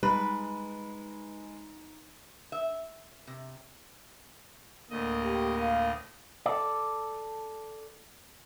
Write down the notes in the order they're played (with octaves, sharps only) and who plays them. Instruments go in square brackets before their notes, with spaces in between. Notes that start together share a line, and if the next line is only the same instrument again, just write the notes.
[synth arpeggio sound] G3 [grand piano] G#3 [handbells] D#4 [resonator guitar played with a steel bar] B4
[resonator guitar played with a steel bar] E5
C3
[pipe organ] D2 A2 D#5 [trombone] A#3
[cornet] G4
F5
[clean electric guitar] A4 D5